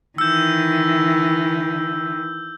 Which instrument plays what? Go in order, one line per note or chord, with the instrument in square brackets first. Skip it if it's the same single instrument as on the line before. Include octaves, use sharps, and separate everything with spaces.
[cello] D#3 E3 [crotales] E6 G6